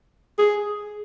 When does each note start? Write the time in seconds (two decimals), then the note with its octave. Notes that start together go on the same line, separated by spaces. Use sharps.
0.38 G#4